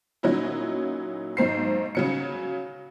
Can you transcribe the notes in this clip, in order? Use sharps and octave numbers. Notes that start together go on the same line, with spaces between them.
A#2 F#3 C#4 D#4 E4
B1 G#2 C5 C7
C#3 F#3 C#7